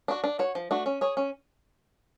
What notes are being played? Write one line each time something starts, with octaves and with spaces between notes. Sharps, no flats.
D4 F#4
D4
F#4 C#5
F3
A3 D4 F#4
C#4
G#4 C#5
C#4